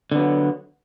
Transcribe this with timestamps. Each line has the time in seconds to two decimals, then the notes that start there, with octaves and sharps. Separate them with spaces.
0.12 D3
0.15 B3
0.19 F#3